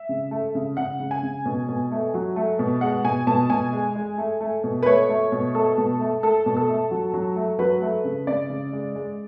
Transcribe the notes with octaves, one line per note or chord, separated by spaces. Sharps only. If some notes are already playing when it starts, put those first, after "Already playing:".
Already playing: E5
C#3
A3
C#3
C#3 F#5
C#3
G#5
C#3
B2
B2
A3
F#3
A3
B2
G#3 F#5
B2 G#5
B2 A5
B2 G#5
G#3
G#3
A3
A3
B2
B4
A3 C#5
A3
B2
A3 A4
B2
A3
A3 A4
B2
A4
A3
F#3
F#3
A3
F#3 B4
A3
C#3
C#3 D5
C#3
G#3
G#3